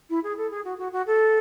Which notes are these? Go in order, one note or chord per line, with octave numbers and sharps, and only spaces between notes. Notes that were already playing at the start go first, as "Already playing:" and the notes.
E4
G#4
A4
G#4
F#4
F#4
F#4
A4